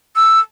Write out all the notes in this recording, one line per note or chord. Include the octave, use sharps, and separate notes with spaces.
E6